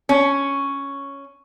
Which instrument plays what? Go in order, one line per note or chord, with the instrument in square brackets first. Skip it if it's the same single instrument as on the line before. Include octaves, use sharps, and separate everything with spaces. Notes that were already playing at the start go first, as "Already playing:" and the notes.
[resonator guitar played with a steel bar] C#4